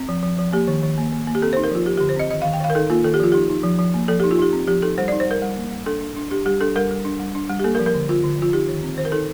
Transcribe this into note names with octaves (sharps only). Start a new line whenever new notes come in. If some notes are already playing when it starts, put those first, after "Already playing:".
Already playing: C4
F3
F3
F3
A#3 G4
D#3
D#3
A#3
A#3
A#3
G4
C4 A4
D#4 C5
A#4
F3 F4
F3 G4
D3 G4
C5
C4 D#5
D#3 D#5
D#3 F5
G5
D#3 F5
A#4
D#4 A4
A#3 F4
D#3 A4
G4
F3 F4
D#4 G4
D#4
F3
F3
A#3
F3 A4
D#4 G4
F4
D#4 G4
C4
F3 G4
D#4 A4
G3 C5
D#4 D5
C5
G3 A#4
G3
A#3
G3
D4 A4
D4
D4
D4 G4
G3 G4
D4 A4
G3 A#4
G3
D4
G3
D4
G3
G4
A#3 A4
A#4
F3
A#4
D3
D3 F4
D3
F3 F4
D#4 G4
D#3
C4
D#3 C5
A#4
D#4 A4